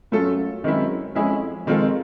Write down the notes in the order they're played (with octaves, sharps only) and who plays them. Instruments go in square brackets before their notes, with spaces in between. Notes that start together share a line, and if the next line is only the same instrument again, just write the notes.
[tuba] F#2 [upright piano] A3 C#4 F4 A4
[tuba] F#2 [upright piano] D#3 G#3 C4 E4
[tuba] F2 [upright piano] G#3 C#4 E4 G#4
[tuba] F2 [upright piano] D#3 G#3 C4 F4 A4